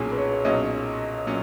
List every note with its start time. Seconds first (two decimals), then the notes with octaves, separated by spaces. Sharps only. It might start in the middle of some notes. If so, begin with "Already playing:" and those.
Already playing: B1 A#2 F#3 C#4 F#4 G#4
0.11 B4
0.17 C#5
0.45 B1 A#2 F#3 C#4 D#5
1.27 A#2 F#3 C#4